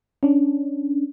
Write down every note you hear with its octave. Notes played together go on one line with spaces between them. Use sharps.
C#4 D4